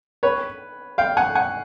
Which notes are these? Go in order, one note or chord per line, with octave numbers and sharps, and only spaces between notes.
B4 C#5
F5 G5
F#5 G#5
F#5 G#5